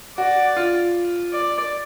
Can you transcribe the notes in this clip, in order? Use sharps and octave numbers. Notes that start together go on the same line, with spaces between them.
F#4 D5
F4
D5